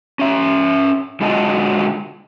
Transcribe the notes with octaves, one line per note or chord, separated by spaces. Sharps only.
C#4 E5
D3 G#3 F4 F#4 D#5 A5